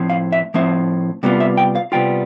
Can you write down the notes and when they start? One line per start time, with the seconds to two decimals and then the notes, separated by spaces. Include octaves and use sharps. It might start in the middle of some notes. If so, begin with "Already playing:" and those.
Already playing: A2 F3 C4
0.10 F5
0.32 E5
0.54 A2 F3 C4 E5
1.23 C3 G3 B3 F4
1.40 E5
1.57 G5
1.75 F5
1.92 C3 G3 B3 F4 G5